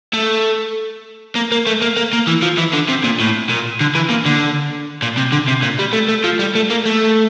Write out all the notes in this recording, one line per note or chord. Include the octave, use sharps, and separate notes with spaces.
A3
A#3
A#3
A3
A#3
A#3
A#3
E3
F3
E3
D3
C3
A#2
A2
A#2
D3
E3
A#2
D3
A#2
C3
D3
C3
A#2
G3
A3
A3
F3
G3
A3
A#3
A3